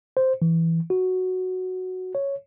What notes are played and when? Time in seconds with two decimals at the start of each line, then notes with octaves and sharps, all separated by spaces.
0.17 C5
0.42 E3
0.90 F#4
2.15 C#5